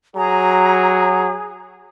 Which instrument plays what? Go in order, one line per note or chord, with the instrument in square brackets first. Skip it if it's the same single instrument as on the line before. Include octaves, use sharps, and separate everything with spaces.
[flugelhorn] F#3 [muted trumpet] G#4 [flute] A#5